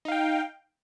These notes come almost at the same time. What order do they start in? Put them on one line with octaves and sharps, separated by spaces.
D#4 F5 G5